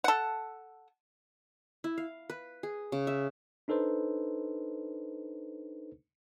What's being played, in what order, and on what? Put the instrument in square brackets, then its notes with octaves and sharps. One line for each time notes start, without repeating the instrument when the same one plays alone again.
[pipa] A4 F#5
[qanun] E4
F5
B4
G#4
C#3
E5
[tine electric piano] D4 D#4 A4 B4 C5